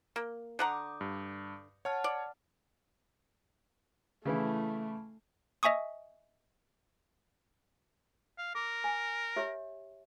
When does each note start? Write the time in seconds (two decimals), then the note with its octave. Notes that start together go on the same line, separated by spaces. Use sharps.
0.16 A#3
0.59 D3 F#5 A#5 D6 D#6 G6
1.01 G2
1.85 C#5 F#5 A5 F6
2.04 D5
4.25 C#3 E3 A3 E4
5.63 D#5 E5 G#5 C#6 D#6
8.38 F5
8.55 A#4 D6
8.84 G#5
9.36 G4 C#5 E5